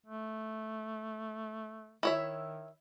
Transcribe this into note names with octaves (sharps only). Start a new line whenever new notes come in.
A3
D#3 E4 C#5 E5